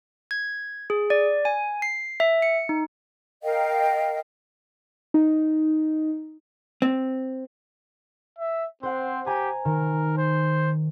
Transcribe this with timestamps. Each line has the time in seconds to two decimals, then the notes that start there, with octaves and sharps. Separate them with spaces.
0.31 G#6
0.90 G#4
1.10 D5
1.45 G#5
1.82 C7
2.20 E5
2.42 C#7
2.69 D#4
3.43 A#4 D#5 F5 G5
5.14 D#4
6.82 C4
8.39 E5
8.83 C4 C5 F#5
9.26 G4 G#5 A#5 D#7
9.65 D#3 A#4
10.17 C5